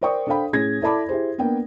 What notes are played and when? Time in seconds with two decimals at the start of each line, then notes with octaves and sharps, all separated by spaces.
0.01 A#4 C5 D5 G5 C#6 D#6
0.27 D4 A4 C5 F5 G5 B5
0.53 A2 C#4 G#4 G#6 A#6
0.82 E4 A4 D5 A5 B5 D6
1.09 E4 G4 G#4 C5
1.38 A#3 B3 D4 G5